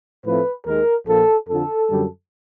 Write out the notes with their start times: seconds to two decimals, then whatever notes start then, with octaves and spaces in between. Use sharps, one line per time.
0.25 A2 F3 A3 C4 B4
0.66 D#2 D#3 G#3 A#4
1.07 A#1 A#2 F3 A4
1.49 F2 D3 F3 A4
1.90 F#2 D3 G3